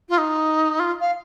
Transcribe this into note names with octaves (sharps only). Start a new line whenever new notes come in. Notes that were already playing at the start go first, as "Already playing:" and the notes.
F4
D#4
F4
F5